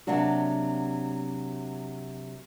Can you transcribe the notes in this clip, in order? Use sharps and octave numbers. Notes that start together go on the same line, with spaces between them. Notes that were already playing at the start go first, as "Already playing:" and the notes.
C3 F#3 A#3 D4 F#4